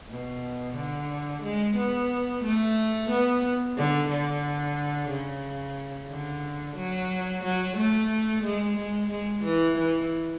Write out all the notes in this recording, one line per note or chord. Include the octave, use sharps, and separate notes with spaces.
B2
D3
G#3
B3
A3
B3
D3
D3
C#3
D3
F#3
F#3
A3
G#3
G#3
G#3
E3
E3